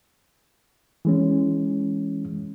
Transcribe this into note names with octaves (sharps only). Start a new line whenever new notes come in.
E3 G#3 C#4